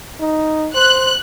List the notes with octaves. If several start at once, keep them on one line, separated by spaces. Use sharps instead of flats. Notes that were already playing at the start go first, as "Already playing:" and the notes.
D#4
C5 F#6